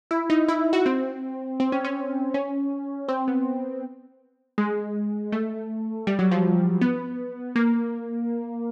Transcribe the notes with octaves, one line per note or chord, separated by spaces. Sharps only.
E4
D#4
E4
F#4
C4
C4
C#4
C#4
C#4
C4
B3
G#3
A3
G3
F#3
F3
B3
A#3